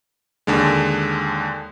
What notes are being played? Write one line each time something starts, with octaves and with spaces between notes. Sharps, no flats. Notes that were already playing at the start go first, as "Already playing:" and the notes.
D#2 D3 G#3